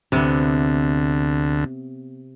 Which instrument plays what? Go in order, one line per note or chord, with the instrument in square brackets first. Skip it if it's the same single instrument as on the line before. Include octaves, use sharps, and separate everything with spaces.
[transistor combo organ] D2 [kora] C3 B3